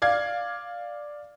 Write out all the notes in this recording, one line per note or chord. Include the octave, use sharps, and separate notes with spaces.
D5 F5 G#6